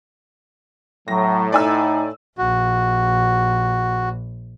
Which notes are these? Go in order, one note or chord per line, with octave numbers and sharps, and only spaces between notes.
A2 F#3 A#6
D#4 D5 G#5 E6
A#1 F#4